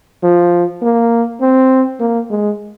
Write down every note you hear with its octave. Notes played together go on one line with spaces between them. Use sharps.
F3
A#3
C4
A#3
G#3